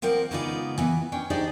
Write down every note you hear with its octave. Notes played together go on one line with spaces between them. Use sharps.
F3 C4 A#4 D5 F#5
C#3 G#3 B3 D#4 F4 D5
E3 B3
C#4 D4 G5
D4 D#4 G4 G#4 C5 D5